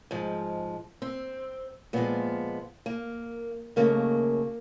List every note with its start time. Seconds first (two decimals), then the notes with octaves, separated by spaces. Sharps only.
0.11 G#2 F3 G#3
1.02 C4
1.93 A#2 F3 G#3 B3
2.86 A#3
3.76 D#2 C#3 F#3 A3 A#3